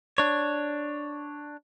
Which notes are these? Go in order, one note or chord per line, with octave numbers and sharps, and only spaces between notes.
D4 C#5